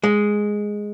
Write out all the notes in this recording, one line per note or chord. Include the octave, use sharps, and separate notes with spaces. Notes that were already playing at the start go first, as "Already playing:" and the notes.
G#3